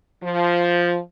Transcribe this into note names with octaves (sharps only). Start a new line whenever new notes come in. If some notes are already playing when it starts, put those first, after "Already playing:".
F3